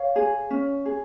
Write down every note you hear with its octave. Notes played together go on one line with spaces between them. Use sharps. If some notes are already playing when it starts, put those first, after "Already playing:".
Already playing: C#5 F5
G#4
C#4
G#4